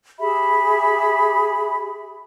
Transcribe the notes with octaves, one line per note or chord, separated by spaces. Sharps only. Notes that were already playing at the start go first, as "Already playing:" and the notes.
G4 G#4 E5 B5